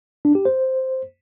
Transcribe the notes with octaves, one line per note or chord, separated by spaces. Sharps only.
D4
G4
C5